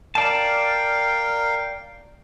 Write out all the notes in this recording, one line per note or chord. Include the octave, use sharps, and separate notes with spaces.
A#4 D5 F5 G5 A5